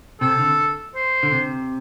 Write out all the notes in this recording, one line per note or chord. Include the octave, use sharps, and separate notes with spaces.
C3 A4
D3
C5
D3
C3